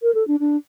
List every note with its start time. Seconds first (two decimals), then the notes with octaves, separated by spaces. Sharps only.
0.02 A#4
0.15 A4
0.28 D4
0.40 D4